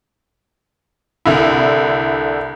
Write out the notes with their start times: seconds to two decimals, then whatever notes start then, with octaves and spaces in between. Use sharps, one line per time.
1.25 C2 D3 E4